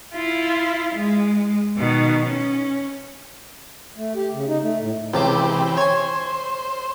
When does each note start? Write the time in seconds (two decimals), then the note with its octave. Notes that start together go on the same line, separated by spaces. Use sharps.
0.15 E4 F4
0.95 G#3
1.77 B2 D#3
2.26 C#4
3.96 A3
4.15 G4
4.33 C#3
4.48 D#4
4.63 A3
4.81 A2
5.14 C#2 C3 E3 C4 G4 D6
5.77 C5 C#5 G#5